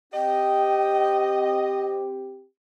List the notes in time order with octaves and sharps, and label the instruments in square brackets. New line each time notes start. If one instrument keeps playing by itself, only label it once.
[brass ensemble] C4 G4 [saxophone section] D#5 [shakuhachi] G5